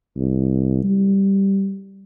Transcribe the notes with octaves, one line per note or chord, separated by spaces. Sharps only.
C2
G3